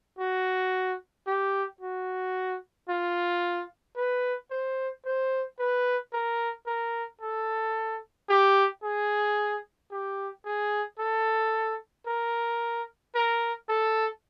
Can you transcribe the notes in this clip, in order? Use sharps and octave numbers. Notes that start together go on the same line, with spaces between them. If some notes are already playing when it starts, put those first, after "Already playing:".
F#4
G4
F#4
F4
B4
C5
C5
B4
A#4
A#4
A4
G4
G#4
G4
G#4
A4
A#4
A#4
A4